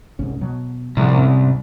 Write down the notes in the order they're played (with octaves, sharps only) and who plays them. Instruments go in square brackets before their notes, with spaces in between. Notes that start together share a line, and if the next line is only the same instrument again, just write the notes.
[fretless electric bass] C2 G#2 C#4
B2 F#3
[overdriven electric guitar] C2 [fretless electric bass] A2 F3 G#3
[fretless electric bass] G#2 C4 C#4